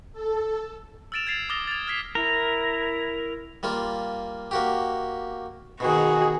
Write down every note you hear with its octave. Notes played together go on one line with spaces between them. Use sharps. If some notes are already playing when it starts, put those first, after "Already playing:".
A4
E6 F6 A6 D7 E7 F7
G#6 A6 C7 F7
D6 D#6 F6 A6 A#6 G7
G#6 A6
F6 G#6 B6 C7
E4 A#4
G3 A#3 F4
A#3 F#4 G4
B2 D#3 F#4 G#4